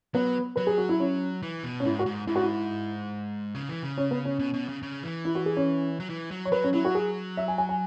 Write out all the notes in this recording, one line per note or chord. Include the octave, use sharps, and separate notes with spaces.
F#3 B3
F#3 B4
G#4
F#4
E4
C#4
E3
B2
C#4
G#2 E4
F#4
G#2
G#2 E4
F#4
E4
C#3
E3
C#3
C#4
B3
C#4
B2
B2
C#3
C#3
E3
E4
F#4
G#4
C#4
F#3
E3
F#3
C#5
F#3 B4
C#4
F#3 E4
F#4
G#4
E5
G#5
G#5
G#5